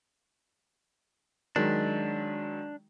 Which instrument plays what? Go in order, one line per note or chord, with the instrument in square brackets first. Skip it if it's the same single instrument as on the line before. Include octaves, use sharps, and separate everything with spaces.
[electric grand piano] D#3 F#3 G#3 [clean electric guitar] D4